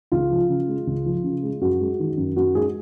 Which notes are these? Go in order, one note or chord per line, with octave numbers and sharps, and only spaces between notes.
C#2 F4
F3
C#3
G#3
C#2
F3
C#3
G#3
F#2 F#4
G#3
D#3
F#2
F#2 F#4
G#3 G#4